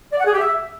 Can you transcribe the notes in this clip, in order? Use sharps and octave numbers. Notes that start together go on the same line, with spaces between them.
D5
F#5
G#4
G4
E5